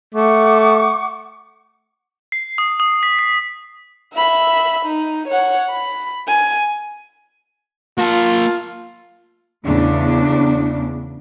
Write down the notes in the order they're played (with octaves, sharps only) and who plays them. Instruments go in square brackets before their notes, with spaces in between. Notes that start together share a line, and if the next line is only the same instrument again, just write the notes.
[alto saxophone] A3 [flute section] F#5 C#6 D6
[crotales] C7
D#6
D#6
B6
B6
[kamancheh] E5 B5
D#4
C#5 F#5
B5
G#5
[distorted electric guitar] A#3 A5 [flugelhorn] F4
[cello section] E2 A2 C#3 D4